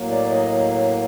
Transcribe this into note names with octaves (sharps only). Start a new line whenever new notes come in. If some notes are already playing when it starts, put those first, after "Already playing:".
Already playing: A2 F#3 A#3
D5
D#5